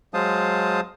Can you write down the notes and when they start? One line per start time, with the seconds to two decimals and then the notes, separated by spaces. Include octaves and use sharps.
0.14 F#3 G#3 C5 F5 A5 D#6